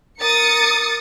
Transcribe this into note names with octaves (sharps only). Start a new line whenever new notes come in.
A#4 D#6 A6 C#7